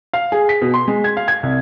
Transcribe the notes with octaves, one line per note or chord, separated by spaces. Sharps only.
F5
G#4
B6
B2
C6
G#3
G#6
F5
G#6
C2